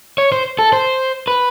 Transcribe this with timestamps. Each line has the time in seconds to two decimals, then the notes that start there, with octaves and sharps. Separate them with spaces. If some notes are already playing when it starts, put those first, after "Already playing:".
0.18 C#5
0.32 C5
0.59 A4
0.73 C5
1.28 B4